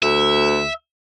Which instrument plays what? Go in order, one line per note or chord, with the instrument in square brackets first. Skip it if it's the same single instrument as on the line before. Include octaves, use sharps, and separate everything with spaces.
[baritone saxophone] D2 [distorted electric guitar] E5